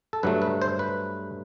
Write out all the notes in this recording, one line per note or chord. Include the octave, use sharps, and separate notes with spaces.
A4
G2 F#3 A3 B4
B4
C5
B4